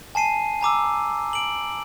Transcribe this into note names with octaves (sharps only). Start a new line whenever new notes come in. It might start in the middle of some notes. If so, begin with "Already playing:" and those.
G#5 A5 C7 D#7
G#5 A#5 D6 E6
D7 F#7